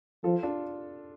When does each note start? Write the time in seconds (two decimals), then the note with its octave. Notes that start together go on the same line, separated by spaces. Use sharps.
0.24 F3 F4 A4
0.43 D4 F4